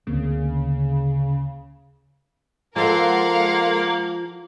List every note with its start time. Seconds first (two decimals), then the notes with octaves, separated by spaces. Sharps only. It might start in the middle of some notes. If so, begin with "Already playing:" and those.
0.07 D2 C#3 A#3 C4
2.76 F3 G#3 A#3 A4 A#4 F5 F#5 C6